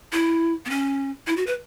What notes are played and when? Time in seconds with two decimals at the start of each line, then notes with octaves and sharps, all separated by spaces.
0.12 E4
0.66 B3
0.70 C#4
1.27 E4
1.37 F#4
1.47 B4